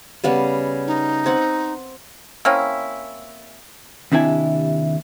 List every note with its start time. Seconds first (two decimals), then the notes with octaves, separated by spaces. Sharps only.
0.24 C#3 G3 B3
0.87 D#4
1.26 C4 F#5
2.45 A#3 C4 C#4 E4
4.12 D#2 C3 D4 E4 G#5